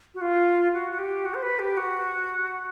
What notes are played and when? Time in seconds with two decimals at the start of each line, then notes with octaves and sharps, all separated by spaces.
0.15 F#4
0.21 F4
0.74 F#4
0.91 F#4
0.99 G4
1.25 F#4
1.34 C5
1.42 B4
1.59 G4
1.77 F#4